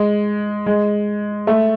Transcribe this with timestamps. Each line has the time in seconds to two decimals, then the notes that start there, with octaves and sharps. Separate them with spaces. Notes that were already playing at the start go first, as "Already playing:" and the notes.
Already playing: G#3
0.66 G#3
1.47 A3